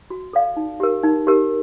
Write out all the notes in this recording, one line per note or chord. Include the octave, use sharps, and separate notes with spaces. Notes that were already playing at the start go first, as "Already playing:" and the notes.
F#4
A4 D5 F5
D#4
G4 A#4
D#4
G4 A#4